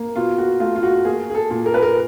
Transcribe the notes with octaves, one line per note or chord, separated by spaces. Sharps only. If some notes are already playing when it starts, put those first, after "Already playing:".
Already playing: A#3
B2 F4
F#4
A3 F4
F4
F#4
A#3 G#4
G#4
A4
A#2
A#4
B4
A#4